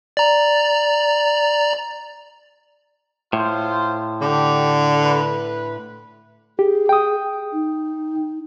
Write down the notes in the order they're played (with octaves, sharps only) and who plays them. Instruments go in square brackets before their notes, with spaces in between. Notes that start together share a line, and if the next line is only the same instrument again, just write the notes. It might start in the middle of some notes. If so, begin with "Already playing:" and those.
[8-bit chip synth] D5 A#5
[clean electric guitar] A2 [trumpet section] F4 C5
[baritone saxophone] D3 [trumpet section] G4
[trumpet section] B4
[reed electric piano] G4 [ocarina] G#4
[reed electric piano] G5 D#6
[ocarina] D#4